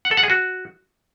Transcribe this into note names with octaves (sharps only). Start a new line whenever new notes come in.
F#5
A4
F#5
G#4
F#4